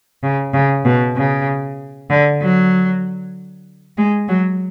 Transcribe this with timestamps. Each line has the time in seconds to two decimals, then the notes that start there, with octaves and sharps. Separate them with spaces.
0.23 C#3
0.53 C#3
0.85 B2
1.16 C#3
2.09 D3
2.41 F#3
3.97 G#3
4.28 F#3